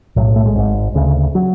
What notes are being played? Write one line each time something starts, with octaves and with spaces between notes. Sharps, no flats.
B1 A2 F#3
A3
G#3
G#1 G#2
D2 C#3
F#3